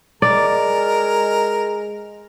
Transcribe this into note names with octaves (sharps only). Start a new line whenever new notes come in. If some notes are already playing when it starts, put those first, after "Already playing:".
G#3 A#4 D5